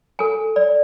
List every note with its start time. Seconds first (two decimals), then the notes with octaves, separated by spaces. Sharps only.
0.19 A4 G#5
0.56 D5